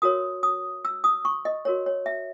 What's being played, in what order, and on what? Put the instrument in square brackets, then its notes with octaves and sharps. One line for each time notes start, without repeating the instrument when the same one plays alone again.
[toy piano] F#4 A#4 C#5 D#6
D#6
E6
D#6
C#6
D#5
F#4 A#4 C#5
C#5
E5